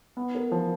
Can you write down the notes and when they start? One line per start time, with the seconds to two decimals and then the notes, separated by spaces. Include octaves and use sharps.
0.17 B3
0.35 A#4
0.52 F3